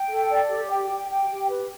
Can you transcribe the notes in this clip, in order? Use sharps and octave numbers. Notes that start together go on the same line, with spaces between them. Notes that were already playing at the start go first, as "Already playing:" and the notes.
Already playing: G5
A4
D5
G4
G5
G4
G5
G4
B4